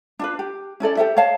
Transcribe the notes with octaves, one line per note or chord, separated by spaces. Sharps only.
D4 F4 B4
G4
C#4 E4 A4 D5
G4 A4 C5 E5
C#5 D#5 F5 A5